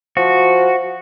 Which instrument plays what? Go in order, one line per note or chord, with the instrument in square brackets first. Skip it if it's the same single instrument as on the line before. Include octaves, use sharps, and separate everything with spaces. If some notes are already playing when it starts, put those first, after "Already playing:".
[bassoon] F3 [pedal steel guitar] F#4